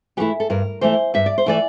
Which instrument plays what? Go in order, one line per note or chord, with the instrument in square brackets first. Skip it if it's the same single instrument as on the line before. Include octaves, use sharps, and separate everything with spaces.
[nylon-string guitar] E3 G4
A3 E4
A4
G2 A#4
E3 A3 E4 C5
G2 E5
D5
C5
E3 A3 E4 D5